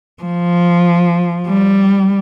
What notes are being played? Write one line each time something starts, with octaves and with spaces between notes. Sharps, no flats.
F3
G3